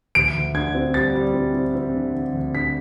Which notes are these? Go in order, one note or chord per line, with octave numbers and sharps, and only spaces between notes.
D2 D7
D2
D3 G#6
C4
G3 A6
G3
C4
C4
C4
D3
D3
D2
D3 B6